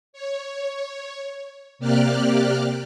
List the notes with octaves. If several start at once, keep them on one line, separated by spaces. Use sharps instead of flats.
C#5
C3 A#3 G4 D5 F6 F#6